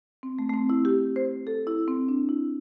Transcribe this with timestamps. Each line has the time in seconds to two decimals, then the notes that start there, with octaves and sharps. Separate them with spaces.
0.23 C4
0.39 A3
0.49 A3
0.54 C4
0.70 E4
0.85 G4
1.16 C5
1.47 A4
1.67 E4
1.88 C4
2.08 D4
2.29 E4